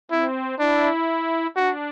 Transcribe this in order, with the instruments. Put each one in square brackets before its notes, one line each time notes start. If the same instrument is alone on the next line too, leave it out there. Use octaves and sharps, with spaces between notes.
[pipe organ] C4 [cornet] E4
[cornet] D4 [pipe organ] E4
[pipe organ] D4 [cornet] F#4